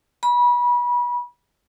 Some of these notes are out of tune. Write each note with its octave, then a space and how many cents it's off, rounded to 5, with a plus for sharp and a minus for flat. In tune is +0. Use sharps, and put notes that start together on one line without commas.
B5 -30